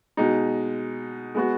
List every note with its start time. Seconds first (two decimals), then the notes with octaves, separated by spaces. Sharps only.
0.17 B2 G#3 D#4
1.35 G#3 B3 F#4